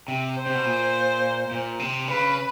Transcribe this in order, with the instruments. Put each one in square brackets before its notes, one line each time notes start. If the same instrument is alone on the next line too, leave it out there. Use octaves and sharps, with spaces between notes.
[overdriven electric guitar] C3
[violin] C5
[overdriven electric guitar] C3
B2
A#2
A#2
C3
[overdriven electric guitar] C#3 [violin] B4